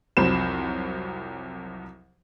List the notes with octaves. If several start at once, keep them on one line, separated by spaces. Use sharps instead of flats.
C2 F2 F#3 C5 B5 E7